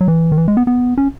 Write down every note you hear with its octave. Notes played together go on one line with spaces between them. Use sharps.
F#3
E3
D#3
E3
G#3
B3
B3
C#4